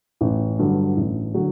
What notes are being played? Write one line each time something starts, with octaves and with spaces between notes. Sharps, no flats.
A1
G2 D3 F#3
A1
D3 F#3